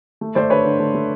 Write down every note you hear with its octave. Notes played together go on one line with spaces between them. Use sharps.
A3
A3 C5 D5
D3 B4 C#5
D3
A3
A3